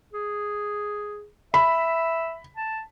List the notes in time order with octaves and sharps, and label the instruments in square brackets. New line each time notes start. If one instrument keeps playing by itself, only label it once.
[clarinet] G#4
[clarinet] E5 [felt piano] B5
[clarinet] A5